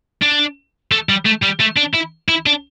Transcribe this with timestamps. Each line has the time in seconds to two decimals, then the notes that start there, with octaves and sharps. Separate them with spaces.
0.22 D4
0.92 A3
1.09 G3
1.26 A3
1.43 G3
1.60 A3
1.77 D4
1.94 E4
2.29 E4
2.46 D4